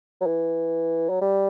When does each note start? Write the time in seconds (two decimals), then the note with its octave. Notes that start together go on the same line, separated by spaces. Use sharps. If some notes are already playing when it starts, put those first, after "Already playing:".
0.21 F#3
0.27 E3
1.10 F#3
1.21 G3